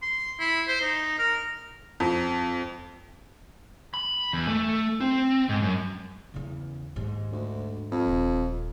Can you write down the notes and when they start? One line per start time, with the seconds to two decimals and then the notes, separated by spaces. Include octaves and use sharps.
0.02 C6
0.40 E4
0.68 C5
0.82 D#4
1.19 A#4
2.00 F2
3.94 B5
4.33 E2
4.49 A3
5.01 C4
5.49 G#2
5.62 F#2
6.34 E2 C#3
6.96 D#2 G#2
7.32 D2
7.92 F2
8.07 D#1